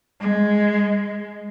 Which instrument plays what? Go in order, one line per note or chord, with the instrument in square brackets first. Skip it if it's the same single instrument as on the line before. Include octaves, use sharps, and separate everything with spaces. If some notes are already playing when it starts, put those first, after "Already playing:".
[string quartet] G#3